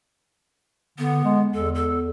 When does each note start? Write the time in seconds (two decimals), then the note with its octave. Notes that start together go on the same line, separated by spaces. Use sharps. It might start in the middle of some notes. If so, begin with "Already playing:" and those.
0.98 D3 B3
1.24 G#3
1.54 E2 A4
1.75 A4